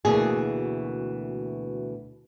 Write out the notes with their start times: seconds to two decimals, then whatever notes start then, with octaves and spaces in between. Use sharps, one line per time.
0.05 D2 B2 E3 A#3 G#4